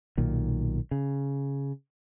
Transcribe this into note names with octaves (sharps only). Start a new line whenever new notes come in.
B1 A#2 D#3
C#3